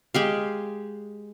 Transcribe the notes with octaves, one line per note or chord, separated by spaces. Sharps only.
G#3 G4 F5